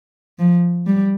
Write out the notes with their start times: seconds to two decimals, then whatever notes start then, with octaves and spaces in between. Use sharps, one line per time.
0.39 F3
0.86 G3